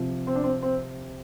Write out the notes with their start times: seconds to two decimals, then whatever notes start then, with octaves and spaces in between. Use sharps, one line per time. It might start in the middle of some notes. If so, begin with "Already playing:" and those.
Already playing: C3 F3
0.27 C4
0.35 D4
0.44 C4
0.62 C4